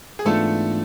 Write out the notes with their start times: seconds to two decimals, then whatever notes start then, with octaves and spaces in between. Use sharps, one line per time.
0.19 G#4
0.25 G#2 E3 A3 B3 D4 F4 A4